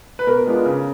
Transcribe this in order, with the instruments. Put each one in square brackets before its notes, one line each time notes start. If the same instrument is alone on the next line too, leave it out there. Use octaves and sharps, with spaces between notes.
[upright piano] B4
B2 A#4
G#3 B3 D4 F4
C#3